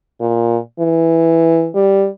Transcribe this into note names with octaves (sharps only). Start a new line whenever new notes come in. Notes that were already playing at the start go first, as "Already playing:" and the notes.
A#2
E3
G3